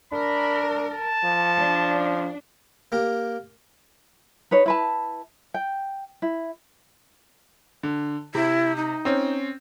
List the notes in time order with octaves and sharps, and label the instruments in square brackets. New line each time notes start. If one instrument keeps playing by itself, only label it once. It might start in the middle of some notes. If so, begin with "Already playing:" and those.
[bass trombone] D4 [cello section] A#4 [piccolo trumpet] B5
[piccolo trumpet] A5
[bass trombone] F3
[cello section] D4
[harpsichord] A#3 G4 A#4
[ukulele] D#4 B4 C#5
E4 B4 A5
G5
E4
[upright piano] D3
[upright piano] C3 [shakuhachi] E4
[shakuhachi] D#4
[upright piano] C4 C#4